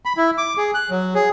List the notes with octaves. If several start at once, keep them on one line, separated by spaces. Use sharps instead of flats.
B5
E4
D6
G#4
F#6
F#3
G#4